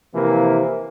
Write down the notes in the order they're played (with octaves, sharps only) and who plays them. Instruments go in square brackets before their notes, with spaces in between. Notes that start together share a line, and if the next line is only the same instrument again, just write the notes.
[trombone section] C3 E3 F3 A#3 E4